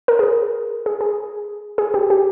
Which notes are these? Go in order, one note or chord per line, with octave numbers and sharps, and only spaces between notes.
A#4
G#4
A#4
G#4
G#4
G#4
G4
G4